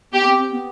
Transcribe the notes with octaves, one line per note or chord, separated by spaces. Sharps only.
B3 G4
C4
C4
B3